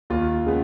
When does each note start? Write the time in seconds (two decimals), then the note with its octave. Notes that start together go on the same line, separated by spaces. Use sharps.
0.10 D#2 F4
0.46 C#3 G#3 B3